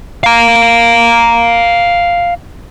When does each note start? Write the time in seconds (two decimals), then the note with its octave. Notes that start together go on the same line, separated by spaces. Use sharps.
0.23 F5 A#5